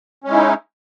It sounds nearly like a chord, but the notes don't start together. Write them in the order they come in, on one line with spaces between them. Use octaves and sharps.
C#4 G#3 E4 D#4